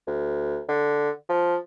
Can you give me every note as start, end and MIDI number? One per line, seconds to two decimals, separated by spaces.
0.07 0.61 38
0.68 1.10 50
1.29 1.56 53